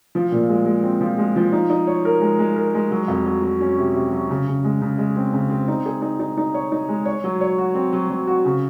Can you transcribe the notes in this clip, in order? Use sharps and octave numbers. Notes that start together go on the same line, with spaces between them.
F3
A#2
G#3
G#3
C4
F3
G#3
F3
D#4
D#4
C#5
A#4
G#3
G#3
A#4
G#3
F#3
F2
F#3
F#3
C#4
C3
C3
F#3
C#3
C#3
G#3
C#3
G#3
C4
C#3
C4
D#4
G#4
D#4
D#4
D#4
C#5
D#4
G#3
C#5
F#3
C#5
F#4
C4
F#3
F#3
F#4
C#3